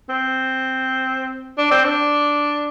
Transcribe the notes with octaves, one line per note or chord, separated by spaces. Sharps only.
C4
D4
C4
D4